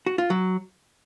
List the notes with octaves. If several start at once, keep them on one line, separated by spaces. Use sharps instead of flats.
F#4
F4
F#3